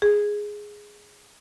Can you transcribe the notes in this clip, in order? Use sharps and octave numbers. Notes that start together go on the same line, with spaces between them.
G#4